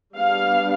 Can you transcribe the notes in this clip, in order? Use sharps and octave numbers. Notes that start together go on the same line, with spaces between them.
G3 B3 D4 F5